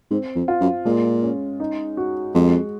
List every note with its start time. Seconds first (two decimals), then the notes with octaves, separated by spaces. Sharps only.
0.10 G#2 C4
0.36 F2
0.48 F4
0.61 F#2
0.85 A#2 G#3
1.23 C#4
1.60 D#4
1.97 F#4
2.35 F2 G#3